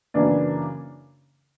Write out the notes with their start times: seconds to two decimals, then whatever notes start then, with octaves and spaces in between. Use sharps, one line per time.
0.14 F#2 C#3 E3 A#3 D4